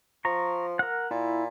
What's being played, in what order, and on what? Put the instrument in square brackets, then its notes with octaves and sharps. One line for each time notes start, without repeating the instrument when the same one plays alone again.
[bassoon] F3 [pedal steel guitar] A#5 C#6
[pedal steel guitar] A#4 F#5
[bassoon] A#2 [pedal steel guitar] E4